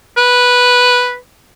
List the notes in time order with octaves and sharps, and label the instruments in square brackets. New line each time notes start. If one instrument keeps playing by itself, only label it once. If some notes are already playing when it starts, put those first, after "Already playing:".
[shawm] B4